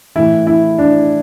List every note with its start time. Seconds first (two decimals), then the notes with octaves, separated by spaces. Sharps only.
0.16 A2 E3 E4
0.47 E4
0.78 D4